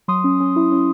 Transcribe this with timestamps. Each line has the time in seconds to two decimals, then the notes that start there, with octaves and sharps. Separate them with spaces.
0.08 F#3 C6 D#6
0.24 C#4
0.40 C#4
0.56 E4
0.72 C#4